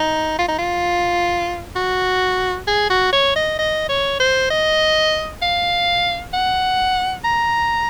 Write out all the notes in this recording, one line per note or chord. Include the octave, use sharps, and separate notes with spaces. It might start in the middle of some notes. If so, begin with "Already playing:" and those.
Already playing: D#4
F4
D#4
F4
F#4
G#4
F#4
C#5
D#5
D#5
C#5
C5
D#5
F5
F#5
A#5